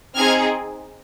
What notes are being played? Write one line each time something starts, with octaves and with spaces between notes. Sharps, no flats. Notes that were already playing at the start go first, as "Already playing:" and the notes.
C4 D#4 G#4 F6 G#6